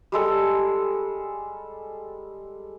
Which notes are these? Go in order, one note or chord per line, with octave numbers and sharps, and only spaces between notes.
G3 G#3 A4